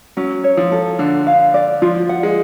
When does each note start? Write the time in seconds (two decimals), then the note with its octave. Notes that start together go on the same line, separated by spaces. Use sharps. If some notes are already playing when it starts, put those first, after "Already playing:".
0.17 F#3 C#4
0.44 C#5
0.57 F3
0.72 A4
0.99 D3 D4
1.27 F5
1.54 D5
1.82 F3 F4
2.09 F#5
2.23 G#3